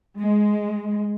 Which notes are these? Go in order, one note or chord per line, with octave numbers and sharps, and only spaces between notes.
G#3